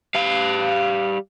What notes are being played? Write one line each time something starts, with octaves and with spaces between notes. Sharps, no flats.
G3 F5